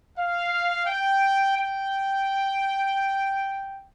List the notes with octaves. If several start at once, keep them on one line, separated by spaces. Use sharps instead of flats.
F5
G5
G5